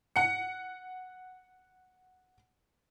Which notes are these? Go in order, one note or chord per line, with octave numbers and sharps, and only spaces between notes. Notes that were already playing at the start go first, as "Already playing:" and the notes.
F#5 C#7